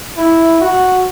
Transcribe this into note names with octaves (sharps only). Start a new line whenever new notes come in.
E4
F#4